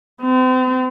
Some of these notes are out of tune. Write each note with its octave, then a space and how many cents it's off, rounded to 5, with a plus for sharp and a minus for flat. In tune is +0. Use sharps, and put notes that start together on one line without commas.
C4 -40